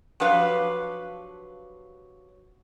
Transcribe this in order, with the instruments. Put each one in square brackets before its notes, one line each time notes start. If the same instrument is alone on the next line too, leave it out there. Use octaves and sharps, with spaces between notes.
[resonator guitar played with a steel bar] F3 F#3 D4 G4 B4 F5